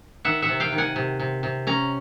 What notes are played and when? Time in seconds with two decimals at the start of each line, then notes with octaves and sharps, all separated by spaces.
0.25 D#3 E5 F#5
0.42 E5 F#5
0.48 C3
0.60 F5 G5
0.72 D#3
0.78 F#5 G#5
0.96 C3
1.20 C3
1.43 C3
1.67 C#4 A#5